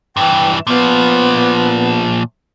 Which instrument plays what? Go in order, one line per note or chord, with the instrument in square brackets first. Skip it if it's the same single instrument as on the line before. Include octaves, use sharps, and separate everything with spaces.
[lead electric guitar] G2 E3 [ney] G5
[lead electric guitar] A#2 F3 [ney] B3